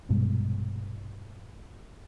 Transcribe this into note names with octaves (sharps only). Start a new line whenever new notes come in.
A#1 G2 B2 G#3